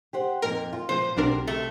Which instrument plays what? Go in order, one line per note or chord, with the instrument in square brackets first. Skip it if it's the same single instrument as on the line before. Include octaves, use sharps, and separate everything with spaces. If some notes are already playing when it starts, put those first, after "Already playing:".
[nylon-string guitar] G4 C5 F#5
[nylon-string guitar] F2 A#2 D#4 [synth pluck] A#4
[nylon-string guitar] F4
[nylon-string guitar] A#2 F3 B4 [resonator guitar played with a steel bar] C5
[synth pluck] B1 D4 A#4 [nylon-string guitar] C3
[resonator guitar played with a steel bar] A3